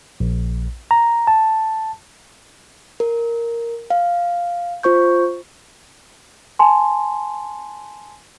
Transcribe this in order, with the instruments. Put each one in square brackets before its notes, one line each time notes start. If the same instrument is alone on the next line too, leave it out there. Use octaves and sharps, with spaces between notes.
[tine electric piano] A#1
A#5
A5
[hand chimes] A#4
F5
F4 C5 C#6 G6
[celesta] G#5 A5 C6